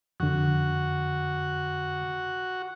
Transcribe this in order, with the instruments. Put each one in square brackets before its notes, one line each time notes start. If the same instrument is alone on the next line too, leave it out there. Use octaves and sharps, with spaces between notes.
[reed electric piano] F2 D3 [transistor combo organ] F#4